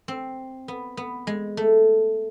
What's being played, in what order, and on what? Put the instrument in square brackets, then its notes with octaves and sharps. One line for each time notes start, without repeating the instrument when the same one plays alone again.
[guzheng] C4
B3
B3
G#3
A3